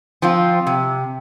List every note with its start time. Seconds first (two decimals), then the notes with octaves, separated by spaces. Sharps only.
0.22 F3 C4 F4
0.67 C3